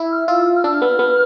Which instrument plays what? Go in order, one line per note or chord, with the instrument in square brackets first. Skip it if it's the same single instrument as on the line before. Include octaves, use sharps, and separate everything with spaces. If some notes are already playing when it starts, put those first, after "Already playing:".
Already playing: [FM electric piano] E4
[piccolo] F6
[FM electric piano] F4 [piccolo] E6
[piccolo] F6
[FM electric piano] D4 [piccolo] E6
[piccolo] F6
[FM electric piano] B3
B3